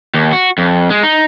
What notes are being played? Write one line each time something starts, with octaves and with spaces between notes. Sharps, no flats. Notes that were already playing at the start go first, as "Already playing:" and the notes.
D#2
F#4
F2
G#3
D#4